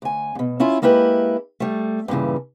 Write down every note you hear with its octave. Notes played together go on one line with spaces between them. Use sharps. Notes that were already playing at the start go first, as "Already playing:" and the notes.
D2 G#5
G2 B2
C#4 E4 F4 E5
G#3 A#3 E4 G4 B4
G3 A3
G2 A#2 C#3 E3